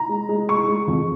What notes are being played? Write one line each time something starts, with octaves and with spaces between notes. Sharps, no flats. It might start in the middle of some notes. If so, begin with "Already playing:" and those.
Already playing: A#5
G#3
G#3
G#3 C#6
G#3
F2